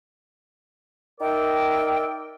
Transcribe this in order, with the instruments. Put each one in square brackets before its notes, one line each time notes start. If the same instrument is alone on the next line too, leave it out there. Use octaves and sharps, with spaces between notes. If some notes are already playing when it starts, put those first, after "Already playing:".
[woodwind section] D#4 A#4 D5 E5 G5